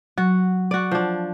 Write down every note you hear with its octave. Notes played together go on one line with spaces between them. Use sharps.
F#3 F#4
F#4 D5
F3 D4